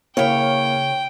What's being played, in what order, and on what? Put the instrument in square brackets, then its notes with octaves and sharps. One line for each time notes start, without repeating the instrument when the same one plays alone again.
[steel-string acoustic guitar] C#3 C#5 [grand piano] A#3 E4 F5 [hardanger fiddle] G5